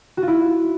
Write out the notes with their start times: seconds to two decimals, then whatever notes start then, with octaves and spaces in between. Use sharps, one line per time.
0.17 F#4
0.23 F4
0.28 E4